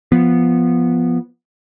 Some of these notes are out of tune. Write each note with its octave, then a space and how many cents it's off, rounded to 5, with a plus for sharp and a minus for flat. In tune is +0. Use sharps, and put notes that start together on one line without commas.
F3 -5 B3 -10